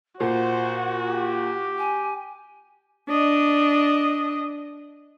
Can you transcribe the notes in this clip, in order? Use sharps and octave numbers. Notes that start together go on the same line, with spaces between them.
A#2 F#4 C5 F#5
G4
G#5
D4 D#5